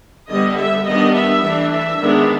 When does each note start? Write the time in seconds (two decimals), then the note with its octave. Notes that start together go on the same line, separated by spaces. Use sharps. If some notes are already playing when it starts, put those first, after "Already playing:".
0.29 D3 G3 B3 D#5
0.57 E5
0.86 D#3 G3 B3 D4 D#5
1.14 E5
1.42 E3 A3 D4
1.71 E5
1.99 D#3 G#3 B3 D4